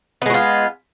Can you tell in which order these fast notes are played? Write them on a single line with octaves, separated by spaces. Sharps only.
B3 G#3 F#4 F4